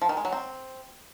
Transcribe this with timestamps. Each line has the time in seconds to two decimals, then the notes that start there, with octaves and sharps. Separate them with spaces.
0.02 F3
0.09 D#3
0.17 G#3
0.25 F#3
0.32 C4